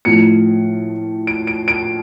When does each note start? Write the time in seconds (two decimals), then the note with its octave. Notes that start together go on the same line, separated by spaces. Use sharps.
0.05 A2 F3 A3 C#7
1.27 D7
1.47 D7
1.68 D7